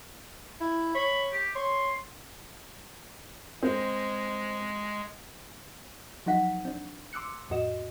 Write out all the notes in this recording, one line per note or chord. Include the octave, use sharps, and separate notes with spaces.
E4
C#5 B5
G4
C#5 C6
G#3 C4
F3 F#3 D#4 F#5 B6
C4 D4
C6 D6 E6 F#6 C#7
F2 A2 F#4 D#5 E7